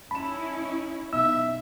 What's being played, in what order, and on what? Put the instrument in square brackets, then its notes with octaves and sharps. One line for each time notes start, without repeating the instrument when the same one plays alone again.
[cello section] C#4 D#4 E4 [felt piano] A5 E7 [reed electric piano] B5
[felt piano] B1 [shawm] E5 [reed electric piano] E6